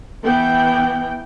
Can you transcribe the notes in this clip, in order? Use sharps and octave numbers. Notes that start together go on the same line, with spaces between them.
E3 B3 G5